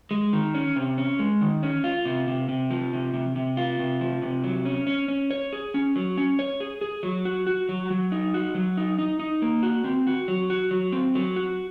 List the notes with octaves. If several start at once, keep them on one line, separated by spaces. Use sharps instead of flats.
G#3
D#3
C#4
C3
C#4
G#3
D#3
C#4
F4
C3
C3
C3
F3
C3
C3
C3
F4
C3
F3
C3
F#3
C#4
C#4
C#4
C#5
G#4
C#4
F#3
C#4
C#5
G#4
G#4
F#3
F#4
F#4
F#3
F#3
D#4
F#4
F#3
D#4
D#4
D#4
A#3
F#4
C4
F#4
F#3
F#4
F#3
C4
F#3
F#4